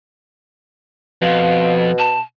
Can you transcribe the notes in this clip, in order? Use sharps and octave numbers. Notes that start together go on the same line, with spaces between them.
F2 B2 F5
A5